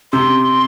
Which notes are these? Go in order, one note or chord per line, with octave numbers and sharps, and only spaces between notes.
C3 C6